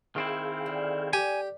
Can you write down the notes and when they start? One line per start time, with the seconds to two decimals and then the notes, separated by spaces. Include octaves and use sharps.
0.16 D#3 C4 E4 G#4 F5 G5
0.66 D3
1.13 G3 G4 G#5